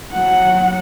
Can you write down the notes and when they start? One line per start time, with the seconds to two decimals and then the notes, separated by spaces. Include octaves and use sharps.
0.12 F#3 F#5